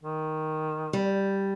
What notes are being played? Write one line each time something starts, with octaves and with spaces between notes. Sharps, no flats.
D#3
G3